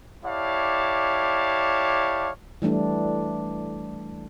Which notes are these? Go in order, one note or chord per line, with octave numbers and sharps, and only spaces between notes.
E4 G4 C#5 D5 F5 A5
E3 G3 A3 D4